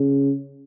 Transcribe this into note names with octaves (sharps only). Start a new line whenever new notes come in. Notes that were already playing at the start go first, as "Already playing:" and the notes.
Already playing: C#3